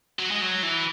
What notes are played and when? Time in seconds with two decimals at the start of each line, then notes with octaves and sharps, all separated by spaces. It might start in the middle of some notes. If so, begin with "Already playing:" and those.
0.19 F#3
0.31 G#3
0.42 F#3
0.63 E3